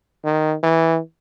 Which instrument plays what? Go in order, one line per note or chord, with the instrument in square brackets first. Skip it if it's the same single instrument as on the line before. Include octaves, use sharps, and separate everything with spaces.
[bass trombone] D#3
E3